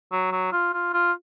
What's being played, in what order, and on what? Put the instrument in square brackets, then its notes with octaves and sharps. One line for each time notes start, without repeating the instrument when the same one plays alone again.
[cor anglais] F#3
F#3
F4
F4
F4